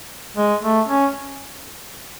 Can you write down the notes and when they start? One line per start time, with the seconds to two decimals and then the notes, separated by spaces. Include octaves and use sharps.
0.37 G#3
0.63 A3
0.88 C#4